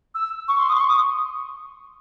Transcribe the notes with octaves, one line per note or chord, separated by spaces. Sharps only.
E6
C#6
C6
D#6
C6
C#6
D#6